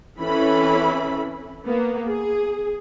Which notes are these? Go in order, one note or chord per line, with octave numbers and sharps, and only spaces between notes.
E3 C4 C#4 E4 A4 B5
A#3 B3
G#4